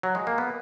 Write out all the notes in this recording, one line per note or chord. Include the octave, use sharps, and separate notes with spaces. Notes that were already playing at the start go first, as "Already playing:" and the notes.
F#3
G#3
A#3
B3